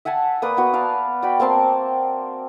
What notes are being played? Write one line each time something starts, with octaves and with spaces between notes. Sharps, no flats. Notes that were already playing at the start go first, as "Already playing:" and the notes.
E5 F#5 G#5 A5
A#3 B4 D5 D#6
B3 F#4
D5 F5 A5
F#4 D5 G5 B5
A#3 C4 A5 C6